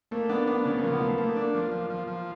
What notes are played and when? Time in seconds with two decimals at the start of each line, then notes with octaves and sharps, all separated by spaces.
0.11 A3 A#3
0.29 B3 D4
0.47 B3 D4
0.65 C#3 B3
0.78 F3 A#3
0.93 B3
1.01 A3
1.18 A3 A#3
1.36 D4
1.54 F3
1.72 F3
1.90 F3
2.07 F3